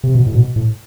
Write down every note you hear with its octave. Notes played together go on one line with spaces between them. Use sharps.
C3
B2
A2
B2
A2